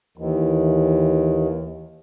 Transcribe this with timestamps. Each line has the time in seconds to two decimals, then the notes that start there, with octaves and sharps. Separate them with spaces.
0.18 D#2 E3